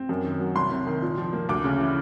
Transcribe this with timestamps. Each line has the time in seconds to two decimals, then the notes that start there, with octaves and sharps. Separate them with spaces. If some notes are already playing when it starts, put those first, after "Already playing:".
Already playing: C4
0.09 F#2
0.24 D#3
0.40 F#3
0.55 C2 C6
0.71 C3
0.87 D#3
1.02 A#2
1.18 F3
1.33 A#3
1.49 D2 D6
1.64 C#3
1.80 E3